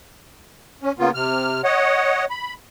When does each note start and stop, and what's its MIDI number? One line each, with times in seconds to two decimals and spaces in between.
0.82 0.92 61
0.99 1.10 49
0.99 1.10 58
0.99 1.10 59
0.99 1.10 65
1.15 1.62 48
1.15 1.62 89
1.64 2.25 73
1.64 2.25 75
1.64 2.25 78
2.30 2.54 83